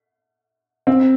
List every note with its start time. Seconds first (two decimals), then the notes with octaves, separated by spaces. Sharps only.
0.87 C4